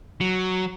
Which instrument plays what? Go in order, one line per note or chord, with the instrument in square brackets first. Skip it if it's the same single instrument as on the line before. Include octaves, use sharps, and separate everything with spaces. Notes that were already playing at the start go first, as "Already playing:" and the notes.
[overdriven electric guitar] F#3